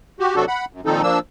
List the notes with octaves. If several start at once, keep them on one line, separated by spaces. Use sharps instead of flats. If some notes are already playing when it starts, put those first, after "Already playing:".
F#4 G4
C3 F#3 D4 F#4 A4
F#5 B5
F#2
A#2 D#3 F3 C4 D#4 A4
F3 A#3 D4 E6